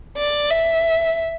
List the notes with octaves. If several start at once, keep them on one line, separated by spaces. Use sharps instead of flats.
D5
E5